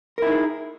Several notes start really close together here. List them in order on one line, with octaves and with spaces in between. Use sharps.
A#4 E4 D#4 G#4